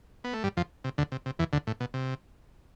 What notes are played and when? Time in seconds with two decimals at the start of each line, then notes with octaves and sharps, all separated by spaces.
0.24 B3
0.33 A3
0.43 G2 G3
0.57 F2 F3
0.84 C3
0.98 D2 D3
1.12 C3
1.26 C3
1.39 E2 E3
1.53 D2 D3
1.67 A2
1.80 B2
1.94 C3